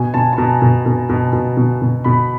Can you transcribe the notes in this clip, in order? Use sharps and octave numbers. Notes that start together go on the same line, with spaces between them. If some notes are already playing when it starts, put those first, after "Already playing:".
Already playing: B2 G#5
B2 A5
A5
B2 A#5
B2
B2
B2
B2
B2
B2
B2 B5